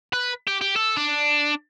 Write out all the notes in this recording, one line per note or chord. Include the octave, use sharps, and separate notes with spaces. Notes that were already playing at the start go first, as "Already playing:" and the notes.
B4
G4
G4
A4
D4